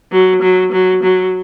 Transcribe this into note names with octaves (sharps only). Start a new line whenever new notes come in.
F#3
F#3
F#3
F#3